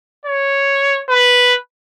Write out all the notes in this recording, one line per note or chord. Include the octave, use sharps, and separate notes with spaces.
C#5
B4